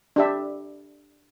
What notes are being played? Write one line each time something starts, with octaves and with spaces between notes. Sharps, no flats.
D4 G4 E5